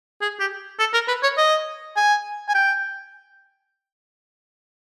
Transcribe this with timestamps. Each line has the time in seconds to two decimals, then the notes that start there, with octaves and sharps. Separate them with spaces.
0.21 G#4
0.40 G4
0.79 A4
0.93 A#4
1.08 B4
1.23 C#5
1.37 D#5
1.96 G#5
2.48 G#5
2.55 G5